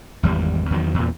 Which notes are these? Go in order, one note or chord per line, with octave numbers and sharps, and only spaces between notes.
G#1 E2 G3
E2 D#3 F#3
E2 A#2